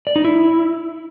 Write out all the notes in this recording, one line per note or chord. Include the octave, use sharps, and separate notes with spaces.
D5
D#4
E4